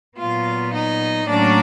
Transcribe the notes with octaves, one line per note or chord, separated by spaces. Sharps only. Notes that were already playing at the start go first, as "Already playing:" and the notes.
A#2 F#3 B3 F4 F5
D#4 D#5
A2 F#3 A#3 C#4 D4 D5